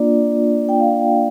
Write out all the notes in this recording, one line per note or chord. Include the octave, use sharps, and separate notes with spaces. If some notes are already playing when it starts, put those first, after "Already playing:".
Already playing: A#3 D4 F4 D5
G5
F5